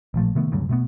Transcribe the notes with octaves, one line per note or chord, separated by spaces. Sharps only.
A1 A#2 F3 A3
C3 D#3 A3 B3
D2 G2 C#3 F#3
B2 A3 B3